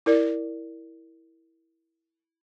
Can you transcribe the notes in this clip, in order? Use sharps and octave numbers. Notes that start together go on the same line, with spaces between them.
E4 A#4 D5